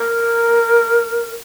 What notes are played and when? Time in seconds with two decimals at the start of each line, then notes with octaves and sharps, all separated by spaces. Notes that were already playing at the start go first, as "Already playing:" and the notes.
Already playing: A#4